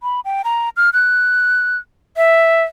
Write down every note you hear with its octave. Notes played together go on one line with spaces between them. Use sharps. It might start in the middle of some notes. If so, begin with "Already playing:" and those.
B5
G5
A#5
F6
F#6
E5